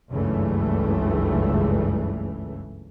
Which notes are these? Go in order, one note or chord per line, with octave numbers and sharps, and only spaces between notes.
F#1 C#2 G2 C#3 E3 A3